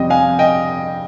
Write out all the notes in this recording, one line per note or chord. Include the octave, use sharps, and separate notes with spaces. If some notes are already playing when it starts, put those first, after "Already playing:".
Already playing: F2 C3 G3 C4 D#5 G5
F5 G#5
D#5 G5